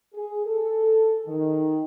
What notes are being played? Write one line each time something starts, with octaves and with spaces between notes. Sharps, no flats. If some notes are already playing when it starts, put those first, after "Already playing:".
G#4
A4
D#3